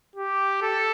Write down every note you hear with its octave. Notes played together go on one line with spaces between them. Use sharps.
G4
A4